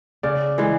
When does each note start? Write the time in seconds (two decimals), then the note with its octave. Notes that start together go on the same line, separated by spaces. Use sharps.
0.23 C#3 D5
0.58 E3 G#3